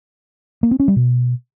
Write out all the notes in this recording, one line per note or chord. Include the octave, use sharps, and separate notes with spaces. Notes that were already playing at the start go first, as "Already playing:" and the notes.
A#3
C4
C#4
G3
B2